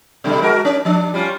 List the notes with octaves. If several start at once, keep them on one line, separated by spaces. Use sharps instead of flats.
B2 D3 G3
G#3 F#4 A#4
C#4
F3 D4
G3 C#4 F4